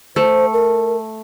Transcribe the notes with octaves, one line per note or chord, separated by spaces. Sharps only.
A3 C5
A#4